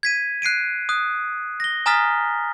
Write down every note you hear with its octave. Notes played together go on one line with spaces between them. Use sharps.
G#6 B6 D#7
F#6 C7 D7 D#7
D#6 F#6
A#6 G7
G#5 A#5 D#6 F6 A6 B6